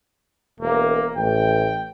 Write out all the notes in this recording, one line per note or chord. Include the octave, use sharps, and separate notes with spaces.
E1 A#3
A1 G5